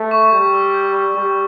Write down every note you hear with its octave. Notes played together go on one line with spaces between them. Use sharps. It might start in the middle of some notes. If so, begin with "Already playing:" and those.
Already playing: A3
C#6
G3 G6
E6
G6
C#6
G3 C#6